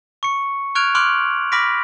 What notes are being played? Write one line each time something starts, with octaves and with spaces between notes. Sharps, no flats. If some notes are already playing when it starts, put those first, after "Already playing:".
C#6 C#7
C#6 F6 F#6 G#6 D7 F7
C6 D6 F6 F#6 D7 F#7
B5 D6 F6 A#6 B6 D7